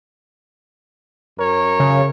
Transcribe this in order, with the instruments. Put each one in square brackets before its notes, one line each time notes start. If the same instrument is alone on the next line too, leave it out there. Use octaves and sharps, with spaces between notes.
[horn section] F#2 A#4 C#5
[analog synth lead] C#3